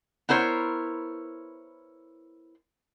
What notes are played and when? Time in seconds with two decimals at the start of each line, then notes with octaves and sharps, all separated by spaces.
0.29 B3 E4 A#4 C5 C#5